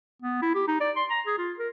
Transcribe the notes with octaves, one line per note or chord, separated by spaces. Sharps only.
B3
E4
G4
D#4
D5
C6
A#5
G#4
F4
A#4